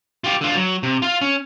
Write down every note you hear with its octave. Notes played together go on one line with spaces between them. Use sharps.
F4 G4
D3 F4
F#3
C3
F4 F5
C#4